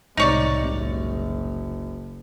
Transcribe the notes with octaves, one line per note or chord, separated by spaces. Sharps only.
C2 A2 C3 G#3 D#4 C#5 D5
F#1